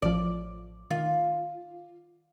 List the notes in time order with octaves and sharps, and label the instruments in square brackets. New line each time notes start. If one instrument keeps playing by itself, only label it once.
[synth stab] A1 F3 [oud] D5
[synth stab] D#3 [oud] F4